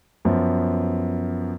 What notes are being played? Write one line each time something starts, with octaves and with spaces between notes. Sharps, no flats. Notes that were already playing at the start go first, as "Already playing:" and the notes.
F#2 F3 B3